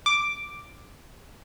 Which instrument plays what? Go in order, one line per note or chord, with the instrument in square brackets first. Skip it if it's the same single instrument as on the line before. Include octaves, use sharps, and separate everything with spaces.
[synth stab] D6